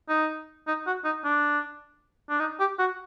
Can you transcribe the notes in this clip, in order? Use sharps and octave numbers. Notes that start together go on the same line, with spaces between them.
D#4
D#4
F#4
D#4
D4
D4
D#4
G4
F#4